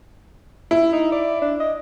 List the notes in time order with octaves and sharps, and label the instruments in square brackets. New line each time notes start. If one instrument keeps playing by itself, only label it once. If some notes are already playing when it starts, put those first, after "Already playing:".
[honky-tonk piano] E4
[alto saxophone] D#4
D5
D4
D#5